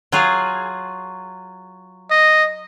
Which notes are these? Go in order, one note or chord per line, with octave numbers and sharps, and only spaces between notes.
F#3 F4 G#4
D#5